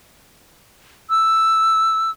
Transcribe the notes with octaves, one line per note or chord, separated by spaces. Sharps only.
E6